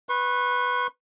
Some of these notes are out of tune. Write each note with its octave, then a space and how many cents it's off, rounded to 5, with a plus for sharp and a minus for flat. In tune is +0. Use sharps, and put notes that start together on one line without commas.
B4 +0 C#6 -40